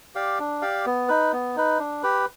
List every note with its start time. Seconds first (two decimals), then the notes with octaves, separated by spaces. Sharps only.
0.15 G4 D5 F5
0.39 D4
0.62 G4 D5 F5
0.86 B3
1.08 D#4 B4
1.33 B3
1.56 D#4 B4
1.79 D4
2.03 G4 B4